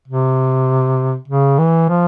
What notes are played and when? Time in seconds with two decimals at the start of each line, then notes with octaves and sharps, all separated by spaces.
0.08 C3
1.28 C#3
1.58 E3
1.89 F3